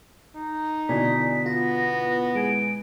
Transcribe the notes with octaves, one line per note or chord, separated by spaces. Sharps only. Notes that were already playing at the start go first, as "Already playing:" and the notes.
D#4
B2 D3 E3 D5 G#5 B6
B3 F4 A#6
G#3 G#5 D7